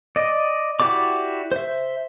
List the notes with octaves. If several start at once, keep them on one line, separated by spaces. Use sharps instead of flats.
D5 D#5
E4 F#4 G4 D5 D6
C5 E5